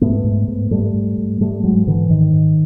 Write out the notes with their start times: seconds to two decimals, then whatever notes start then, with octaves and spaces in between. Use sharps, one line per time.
0.01 G#2 A3 B3
0.24 G#2
0.48 G#2
0.71 G#2 G3 A3
0.94 G#2
1.18 G#2
1.40 G#2 G3 A3
1.64 G#2 F#3 G#3
1.87 G#2 D3 E3
2.10 G#2 D#3
2.33 G#2